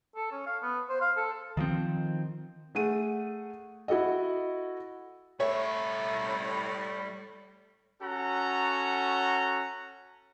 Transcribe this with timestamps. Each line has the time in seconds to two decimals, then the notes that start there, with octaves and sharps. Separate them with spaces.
0.16 A4
0.32 C#4
0.46 F5
0.62 B3
0.89 C5
1.01 F5
1.17 A4
1.57 D#3 F3 G#3 C4
2.75 A3 G#4 F#5 D#7
3.88 E4 F#4 A4 D#5
5.40 A2 G3 A4 C#5 E5
8.02 C#4 F#4 A4 F#5 A#5